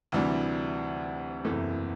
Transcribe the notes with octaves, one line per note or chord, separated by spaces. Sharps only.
D2 C3 E3 G3 D4
F#1 E2 C3 E3 A3